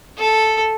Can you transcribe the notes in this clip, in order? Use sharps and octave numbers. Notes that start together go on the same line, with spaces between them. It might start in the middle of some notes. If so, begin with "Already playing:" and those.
A4